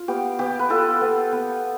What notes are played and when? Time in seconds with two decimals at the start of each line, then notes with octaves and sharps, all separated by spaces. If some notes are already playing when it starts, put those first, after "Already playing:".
Already playing: F4
0.08 B3 G4
0.39 B3 G4
0.59 B4
0.70 F4 A4
1.01 B3
1.32 B3